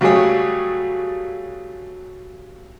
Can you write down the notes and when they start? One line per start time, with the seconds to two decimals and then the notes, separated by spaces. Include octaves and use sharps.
0.01 C#3 F#3 G3 A3 G#4 C#5